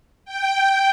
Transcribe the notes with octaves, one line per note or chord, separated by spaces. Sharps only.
G5